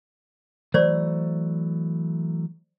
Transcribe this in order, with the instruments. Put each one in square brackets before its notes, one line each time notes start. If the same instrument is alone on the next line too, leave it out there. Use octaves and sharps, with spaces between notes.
[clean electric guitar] E3 F#3 A3 [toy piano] C5 D5